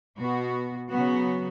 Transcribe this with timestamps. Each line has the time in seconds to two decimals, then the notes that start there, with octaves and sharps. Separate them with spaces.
0.19 B2 B3 F#4
0.89 C#3 F#3 B3 F#4